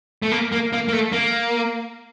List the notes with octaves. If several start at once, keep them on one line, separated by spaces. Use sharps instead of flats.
A3
A#3
A#3
A#3
A#3
A3
A#3